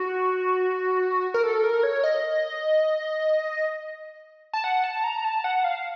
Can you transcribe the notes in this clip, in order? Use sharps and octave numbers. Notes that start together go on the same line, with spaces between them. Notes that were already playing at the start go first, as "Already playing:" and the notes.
Already playing: F#4
A#4
A4
A#4
C#5
D#5
A5
F#5
A5
A#5
A5
F#5
F5